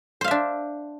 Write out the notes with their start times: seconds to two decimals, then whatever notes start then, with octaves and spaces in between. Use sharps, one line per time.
0.21 C5
0.24 F5
0.28 E5
0.31 D4